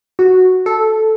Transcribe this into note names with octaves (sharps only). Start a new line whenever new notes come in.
F#4
A4